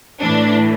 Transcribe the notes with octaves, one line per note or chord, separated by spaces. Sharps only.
A2 E3 D4